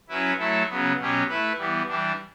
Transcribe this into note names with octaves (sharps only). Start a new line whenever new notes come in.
F#3 C#4 E4 B4
F#3 A3 E4 A4
C#3 F#3 B3
B2 F#3 C#4 G4
A3 E4 B4
E3 G3 B3
E3 G3 D4